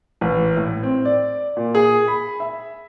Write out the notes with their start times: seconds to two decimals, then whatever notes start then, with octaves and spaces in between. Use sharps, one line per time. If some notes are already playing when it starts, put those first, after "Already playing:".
0.21 A1
0.57 A2
0.83 C4
1.05 D5
1.57 A#2
1.75 G#4
2.08 B5
2.40 E5